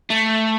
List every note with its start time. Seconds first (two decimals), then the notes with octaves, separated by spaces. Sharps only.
0.10 A3